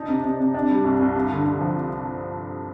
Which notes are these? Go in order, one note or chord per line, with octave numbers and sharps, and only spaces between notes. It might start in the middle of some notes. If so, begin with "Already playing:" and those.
Already playing: D4 D#4
C3
C3
C3
D4
G3
C2
C2
G2
D3
D3
F3